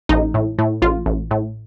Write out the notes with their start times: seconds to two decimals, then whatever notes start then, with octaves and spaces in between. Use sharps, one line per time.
0.09 A1 D#4
0.34 A2
0.58 A2
0.82 A1 F4
1.06 A1
1.31 A2